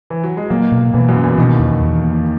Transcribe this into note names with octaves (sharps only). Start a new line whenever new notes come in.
E3
F#3
G#3
A#2 F#3 A#3
B2
E2 B2 E3
F#2 F#3
C#4
E2 E3
D#2 B2 D#3
E2
E2
A#3